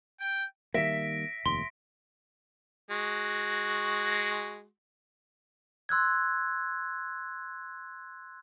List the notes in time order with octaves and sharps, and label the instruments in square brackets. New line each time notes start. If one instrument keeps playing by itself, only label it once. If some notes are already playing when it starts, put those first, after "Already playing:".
[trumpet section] G5
[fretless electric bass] D#3 G3 A#3 [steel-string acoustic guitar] E5 [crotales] A#6 B6 D7
[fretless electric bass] F1 D#2 [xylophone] C6
[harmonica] G#3 F#4
[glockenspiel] C6 E6 F#6 G#6